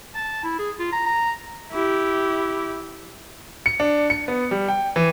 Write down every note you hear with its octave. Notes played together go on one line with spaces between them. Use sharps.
A5
E4
G#4
F4
A#5
A#5
E4 G4
C#7
D4
C#7
B3
G3
G5
E3